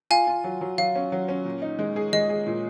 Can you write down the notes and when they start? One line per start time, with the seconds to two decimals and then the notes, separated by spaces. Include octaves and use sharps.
0.10 F4 F5 G#5
0.27 F4
0.44 F#3
0.61 F#3
0.78 F#3 F5
0.95 C#4
1.12 F#3
1.28 C#4
1.45 A#2
1.62 D#4
1.79 G#3
1.96 G#4
2.13 G#3 D#5
2.30 G#4
2.46 A#2